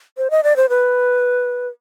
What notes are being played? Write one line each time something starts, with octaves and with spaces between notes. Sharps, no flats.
C5
D#5
D5
C5
B4